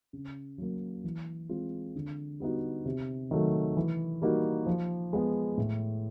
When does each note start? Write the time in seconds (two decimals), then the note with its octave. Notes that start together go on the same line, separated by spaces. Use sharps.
0.13 C#3
0.58 F#3 A#3
1.04 E3
1.49 G#3 C4 F4
1.95 D3
2.40 G3 B3 D#4 F#4
2.86 C3
3.31 D#3 F#3 A3
3.77 E3
4.22 G3 A#3 D#4 F#4
4.66 F3
5.13 G#3 B3
5.57 A2